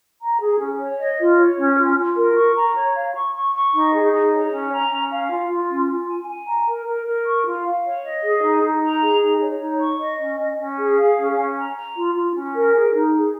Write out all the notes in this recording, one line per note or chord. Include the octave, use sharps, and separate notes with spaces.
A#5
G#4
C#4
C#5
D#5
F4
C#5
C#4
F4
F4
A#4
C#6
A#5
C#5
F5
C#6
C#6
C#6
D#4
G#4
D#4
C#5
C#4
A#5
C#4
F5
F4
F4
C#4
F4
G#5
G#5
A#5
A#4
A#4
A#4
C#6
F4
F5
C#5
D#5
G#4
D#4
D#4
A#5
G#4
D#4
C#5
D#4
C#6
D#5
C#4
C#4
C#4
G#4
F5
C#4
C#4
A#5
A#5
F4
F4
C#4
A#4
G#4
D#4
G#4